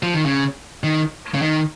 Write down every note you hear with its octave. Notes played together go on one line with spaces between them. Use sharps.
F3
D#3
C#3
D#3
C#3
D#3